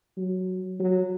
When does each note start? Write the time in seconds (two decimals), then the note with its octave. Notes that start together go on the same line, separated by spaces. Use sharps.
0.17 F#3
0.80 F#3